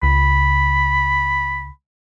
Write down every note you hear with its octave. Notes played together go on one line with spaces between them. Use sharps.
C#2 B5